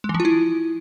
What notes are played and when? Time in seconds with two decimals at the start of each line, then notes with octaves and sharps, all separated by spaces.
0.04 G#3
0.09 E3
0.14 F3
0.20 F4
0.25 E4